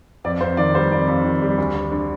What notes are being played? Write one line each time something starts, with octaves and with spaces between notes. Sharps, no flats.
F2 D5
F2 C5
D#3 D5
G3 C5
F2 D5
F2
D#3
G3
D2
D2
D3